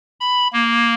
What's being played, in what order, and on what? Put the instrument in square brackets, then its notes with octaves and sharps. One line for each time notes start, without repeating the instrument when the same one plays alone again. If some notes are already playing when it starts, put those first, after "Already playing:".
[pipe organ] B5
A#3